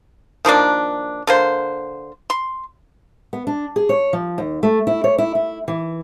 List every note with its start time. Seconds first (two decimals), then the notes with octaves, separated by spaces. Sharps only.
0.45 D#3 F3 A#3 D4
1.27 D3 A#3 C5
2.30 C6
3.33 B3
3.47 D4
3.76 G#4
3.89 C#5
4.13 F3
4.38 D#2
4.63 A3
4.87 E4
5.04 C#5
5.18 E4
5.35 E4
5.68 E3